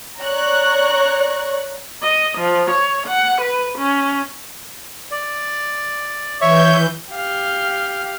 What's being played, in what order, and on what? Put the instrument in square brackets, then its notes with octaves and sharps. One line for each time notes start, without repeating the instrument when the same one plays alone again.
[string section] C#5 D5 A#5 C#6 F#6
[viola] D#5
F3
C#5
F#5
B4
C#4
[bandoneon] D5
[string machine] E3 G6 [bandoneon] C#5 E5 C#6
[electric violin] G4 F5